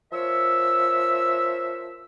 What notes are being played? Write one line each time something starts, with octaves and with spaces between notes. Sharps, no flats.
F3 A#4 C5 C#5 E5 E6